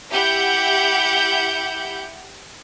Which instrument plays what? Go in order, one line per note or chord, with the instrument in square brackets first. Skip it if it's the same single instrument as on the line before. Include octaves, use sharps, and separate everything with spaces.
[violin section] E4 G4 F#5 G6